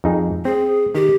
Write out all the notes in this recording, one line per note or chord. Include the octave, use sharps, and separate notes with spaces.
F2 D#4 G#4
C4 G#4
D#3 G4